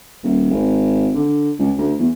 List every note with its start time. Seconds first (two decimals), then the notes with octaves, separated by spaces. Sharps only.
0.23 D#1
0.51 G#1
1.15 D3
1.59 C#2
1.78 D2
1.99 E2